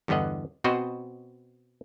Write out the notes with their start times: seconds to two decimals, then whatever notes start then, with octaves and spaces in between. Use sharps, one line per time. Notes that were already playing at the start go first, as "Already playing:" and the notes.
0.08 E2 G2 D3 B3 D#5 F#5
0.64 B2 C4 F#4 B4 C5 D#5